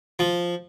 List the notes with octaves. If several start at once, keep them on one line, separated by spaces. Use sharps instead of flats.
F3